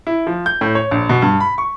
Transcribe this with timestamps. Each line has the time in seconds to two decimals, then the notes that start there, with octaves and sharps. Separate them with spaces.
0.07 E4
0.27 F3
0.46 G6
0.61 A2
0.75 C#5
0.91 A#1
1.09 B2
1.22 G2
1.40 B5
1.58 C#6